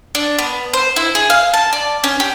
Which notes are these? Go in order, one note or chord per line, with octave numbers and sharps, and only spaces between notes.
D4
B3
C5
E4
G#4
F5
A5
D5
C#4
G4